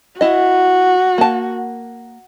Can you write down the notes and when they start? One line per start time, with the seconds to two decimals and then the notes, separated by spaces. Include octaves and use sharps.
0.21 E4 F#4 D#5
1.18 A#3 A5